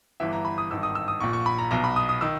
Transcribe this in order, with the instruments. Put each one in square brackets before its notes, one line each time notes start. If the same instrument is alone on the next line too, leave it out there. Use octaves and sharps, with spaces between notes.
[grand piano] G1 G2 E3 E5
A#5
B5
D#6
G#1 G2 D#3 E6
D#6
E6
D#6
A#1 A#2 C#6
C#6
B5
A#5
B1 B2 A#5
B5
D#6
D#6
D#3 E6